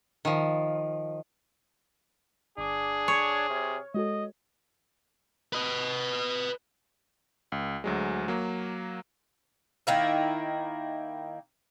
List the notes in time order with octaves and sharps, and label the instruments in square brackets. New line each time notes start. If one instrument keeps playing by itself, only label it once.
[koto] D#3 F3
[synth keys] G1 D6 [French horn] D4 [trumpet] G#4
[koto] C#5
[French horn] C3 [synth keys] F6
[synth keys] G#3 F#4 A4 [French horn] D#5
[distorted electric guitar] B4 D#5
[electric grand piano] C#2
D2 F#3 G#3
F#3 A#3
[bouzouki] D#3 A#3 E4